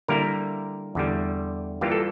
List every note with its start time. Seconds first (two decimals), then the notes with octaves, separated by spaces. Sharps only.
0.08 D3 G3 A#3 E4 A#4
0.95 E2 D3 G3
1.81 E3 G3 A#3 F4 G4
1.92 A4